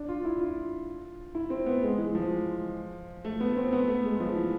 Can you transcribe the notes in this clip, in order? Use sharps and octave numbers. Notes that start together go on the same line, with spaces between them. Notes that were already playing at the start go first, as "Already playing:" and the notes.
Already playing: D4
F4
E4
F4
E4
C4
B3
G#3
E3
F3
A3
B3
C4
B3
A3
G#3
F3
E3